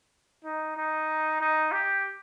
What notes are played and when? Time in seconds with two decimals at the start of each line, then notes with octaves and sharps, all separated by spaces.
0.45 D#4
0.77 D#4
1.40 D#4
1.72 G4